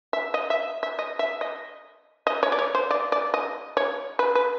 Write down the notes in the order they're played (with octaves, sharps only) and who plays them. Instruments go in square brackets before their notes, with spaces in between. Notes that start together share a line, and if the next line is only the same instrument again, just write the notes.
[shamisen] E5
D#5
E5
E5
D#5
E5
D#5
D#5
C#5
D5
C#5
C5
D5
D5
D#5
C#5
B4
B4